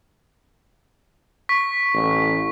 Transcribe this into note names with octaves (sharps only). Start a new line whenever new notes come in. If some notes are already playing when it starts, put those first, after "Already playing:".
C#6 B6
A1